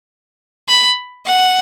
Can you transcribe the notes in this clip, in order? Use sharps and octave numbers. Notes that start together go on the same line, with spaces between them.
B5
F#5